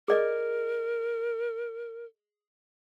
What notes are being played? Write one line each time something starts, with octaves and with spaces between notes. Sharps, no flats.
G#4 A#4 D5 D#5